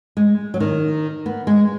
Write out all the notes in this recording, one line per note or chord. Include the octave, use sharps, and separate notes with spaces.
G#3
F#3
D#3
B3
G#3